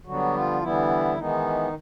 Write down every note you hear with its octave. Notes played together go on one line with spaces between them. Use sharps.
D3 F#3 G3 B3 F#4
F3 F4
D3 E3 G3 B3 E4
D#3 E3 G#3 B3 D#4